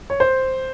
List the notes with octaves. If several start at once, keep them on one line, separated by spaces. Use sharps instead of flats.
C#5
C5